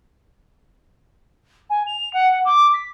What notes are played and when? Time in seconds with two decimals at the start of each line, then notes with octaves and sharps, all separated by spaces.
1.69 G#5
1.86 F7
2.13 F#5
2.45 D6
2.73 B6